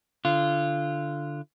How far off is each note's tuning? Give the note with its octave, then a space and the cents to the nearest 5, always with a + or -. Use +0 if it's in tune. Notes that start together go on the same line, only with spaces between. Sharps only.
D3 +0 F4 -20